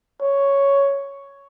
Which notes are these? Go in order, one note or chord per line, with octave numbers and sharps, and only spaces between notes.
C#5